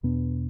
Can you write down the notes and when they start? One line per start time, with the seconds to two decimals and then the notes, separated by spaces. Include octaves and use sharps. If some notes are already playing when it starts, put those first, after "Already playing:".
0.03 E2 B2 B3 D4